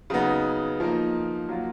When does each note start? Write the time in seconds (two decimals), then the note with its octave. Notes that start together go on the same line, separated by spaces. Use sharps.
0.10 C#3 F#3 B3 D#4
0.80 F3 A#3 D#4
1.49 F#3 A#3 F4